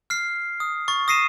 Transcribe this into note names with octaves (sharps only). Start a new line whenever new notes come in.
F6 C7
D#6
C#6 A6
D#6 A#6 C7 D#7 E7